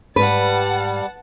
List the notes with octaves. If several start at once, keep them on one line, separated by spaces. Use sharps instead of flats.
G#2 G3 B4 F#5 A5